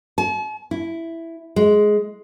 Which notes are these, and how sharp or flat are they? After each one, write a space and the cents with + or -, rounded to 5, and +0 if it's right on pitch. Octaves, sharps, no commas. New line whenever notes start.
A5 -45
E4 +5
G#3 +10